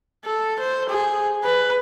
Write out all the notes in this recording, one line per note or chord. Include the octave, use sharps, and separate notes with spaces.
A4
C5
G#4
B4